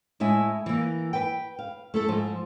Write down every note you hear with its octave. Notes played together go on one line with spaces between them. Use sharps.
A2 G#3 E4 E5 G#5
E3 A#3
B4 G5
F5
A3 E4 A4
G#2 F3